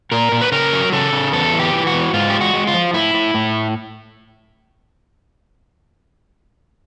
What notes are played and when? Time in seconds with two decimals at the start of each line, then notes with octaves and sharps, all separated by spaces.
0.12 A#2 A#4
0.32 A#2
0.41 B4
0.52 C#3 A#4
0.73 F#3
0.92 C#3 A4
1.13 C#3
1.33 E2 A4
1.53 E3
1.59 G4
1.73 E3
1.87 F#4
1.93 E2
2.13 G#2 F4
2.30 G#3 G4
2.41 F#4
2.53 G#3
2.67 F4
2.74 F3
2.94 A2 E4
3.14 A2
3.34 A2